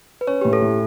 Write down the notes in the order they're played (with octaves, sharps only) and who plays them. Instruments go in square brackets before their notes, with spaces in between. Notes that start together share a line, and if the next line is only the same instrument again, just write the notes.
[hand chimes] B4
[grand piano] C#4 [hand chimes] C#5
[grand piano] A2 [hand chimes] G4
[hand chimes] A4
[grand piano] A2